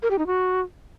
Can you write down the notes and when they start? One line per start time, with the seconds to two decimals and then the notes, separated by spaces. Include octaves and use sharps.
0.02 A#4
0.10 G4
0.18 D#4
0.26 F#4